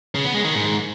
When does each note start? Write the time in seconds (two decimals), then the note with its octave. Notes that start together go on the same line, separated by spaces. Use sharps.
0.15 C#3
0.25 B3
0.35 G#3
0.44 D#3
0.54 G#2